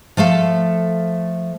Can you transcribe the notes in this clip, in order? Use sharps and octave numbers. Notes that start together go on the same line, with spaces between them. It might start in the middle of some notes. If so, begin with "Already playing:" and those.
F3 A3 A4 F5